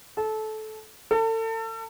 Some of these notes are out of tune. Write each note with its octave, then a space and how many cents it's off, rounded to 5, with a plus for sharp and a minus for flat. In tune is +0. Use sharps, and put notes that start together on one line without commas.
A4 -20
A4 +35